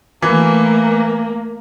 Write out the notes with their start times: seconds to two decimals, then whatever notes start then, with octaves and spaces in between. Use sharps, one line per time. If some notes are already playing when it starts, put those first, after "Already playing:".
0.22 E3 A3 A#3